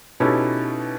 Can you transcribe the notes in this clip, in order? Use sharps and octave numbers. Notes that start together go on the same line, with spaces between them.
B2 C#4 D#4 E4 G4 A4